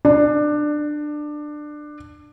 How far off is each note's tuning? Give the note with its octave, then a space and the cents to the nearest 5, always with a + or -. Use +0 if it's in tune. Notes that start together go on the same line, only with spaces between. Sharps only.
D4 +20